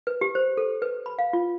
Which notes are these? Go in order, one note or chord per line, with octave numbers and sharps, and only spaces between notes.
B4
G4
C5
A4
B4
B5
F5
F4